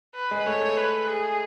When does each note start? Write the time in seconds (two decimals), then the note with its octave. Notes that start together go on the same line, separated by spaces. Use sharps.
0.15 B4
0.31 G#3
0.46 A3 C#5
0.61 A3
0.77 B4
1.07 G#4